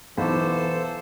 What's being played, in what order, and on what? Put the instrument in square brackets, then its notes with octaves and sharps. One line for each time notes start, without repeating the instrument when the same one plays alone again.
[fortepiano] B1 [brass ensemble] E3 [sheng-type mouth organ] A4 C5 [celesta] F5 C#6 D6